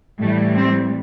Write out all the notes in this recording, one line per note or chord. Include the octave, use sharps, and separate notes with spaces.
A2 E3 G3 A3
C4